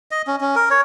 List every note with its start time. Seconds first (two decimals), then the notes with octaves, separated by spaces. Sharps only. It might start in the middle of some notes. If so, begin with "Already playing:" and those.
0.11 D#5
0.27 C#4
0.41 C#4
0.56 A#4
0.71 C#5